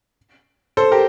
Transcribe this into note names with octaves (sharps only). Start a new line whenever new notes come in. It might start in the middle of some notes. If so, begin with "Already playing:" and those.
A4 C5
G4 A#4